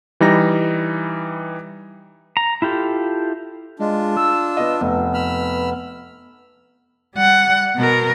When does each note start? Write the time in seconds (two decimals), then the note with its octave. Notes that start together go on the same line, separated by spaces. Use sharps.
0.20 E3 G3 D#4 A#6
2.37 A#5
2.62 E4 F4 G4 A4
3.79 G#3 D4 F4
4.17 E6
4.57 B3 D#5
4.81 F1 B3
5.14 B5 E6 F6
7.15 G3 F#5
7.76 B2 A#4